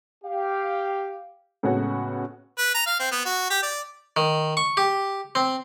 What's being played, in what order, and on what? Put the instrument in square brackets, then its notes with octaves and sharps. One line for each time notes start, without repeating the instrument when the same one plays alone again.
[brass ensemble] G4 F5
[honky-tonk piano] A2 C#3 G#3 B3 C#4 F#4
[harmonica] B4
A#5
F5
C4
B3
F#4
G4
D5
[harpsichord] D#3
C#6
G4
C4